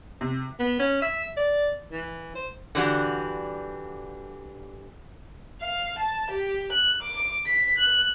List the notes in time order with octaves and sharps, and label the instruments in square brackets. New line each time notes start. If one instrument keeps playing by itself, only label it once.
[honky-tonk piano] C3
[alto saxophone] B3
C#4
E5
D5
E3
C5
[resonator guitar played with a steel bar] D3 E3 G3 F#4
[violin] F5
A5
G4
F#6
D6
B6
F#6